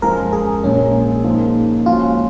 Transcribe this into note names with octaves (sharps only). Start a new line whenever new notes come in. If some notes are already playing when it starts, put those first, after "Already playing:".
F#2 F3 G#3 A#4
G#4
A#1 A#2 G#3 C#4
A#2 F3 A#3 D#4
A#2 F3 G#3 C#4 F4 F#4